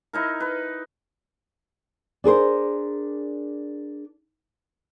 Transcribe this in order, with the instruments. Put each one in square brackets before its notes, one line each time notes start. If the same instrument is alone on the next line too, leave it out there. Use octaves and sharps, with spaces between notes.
[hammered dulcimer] D#4 E4 A#4
B4
[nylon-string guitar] D4 G#4 A#4 C5